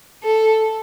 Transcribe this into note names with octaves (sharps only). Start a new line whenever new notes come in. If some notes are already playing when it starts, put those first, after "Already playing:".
A4